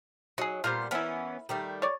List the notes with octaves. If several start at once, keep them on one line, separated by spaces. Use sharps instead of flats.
F#3 D#4 G#4
A#2 G3 B3 F4 A#4 C5
E3 B3 C#4 E4 A#4
D#3 G3 A3
C#5 D5